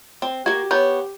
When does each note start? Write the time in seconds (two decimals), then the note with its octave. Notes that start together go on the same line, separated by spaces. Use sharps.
0.22 C4
0.46 A#3 F#4 G4 G#6
0.71 B3 C#5 G6